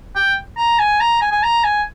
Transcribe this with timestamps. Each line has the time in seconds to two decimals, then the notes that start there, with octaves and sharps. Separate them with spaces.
0.15 G5
0.57 A#5
0.79 G#5
1.00 A#5
1.21 G#5
1.32 G#5
1.43 A#5
1.64 G#5